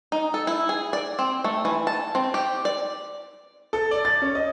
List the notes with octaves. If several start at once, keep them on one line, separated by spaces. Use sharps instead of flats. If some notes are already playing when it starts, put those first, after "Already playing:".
D#4
A4
E4
G#4
D5
C4
A3
E3
A5
C4
G4
D5
A4
D5
A6
C#4
D#5